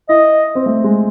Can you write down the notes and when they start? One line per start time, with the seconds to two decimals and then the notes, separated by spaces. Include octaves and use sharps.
0.09 E4 D#5
0.55 C4
0.66 A3
0.84 G#3